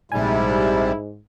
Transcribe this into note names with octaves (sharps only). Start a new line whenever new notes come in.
A#1 G#2 C3 G3 E4 G#5